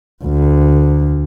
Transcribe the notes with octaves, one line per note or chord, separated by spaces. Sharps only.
D2